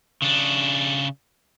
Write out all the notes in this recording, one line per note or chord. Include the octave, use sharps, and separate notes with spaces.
C#3 D4